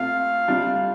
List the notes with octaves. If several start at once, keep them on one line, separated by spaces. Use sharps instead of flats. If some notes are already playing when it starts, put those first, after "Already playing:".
Already playing: C3 A3 F4 F5
C3 G3 D4 F4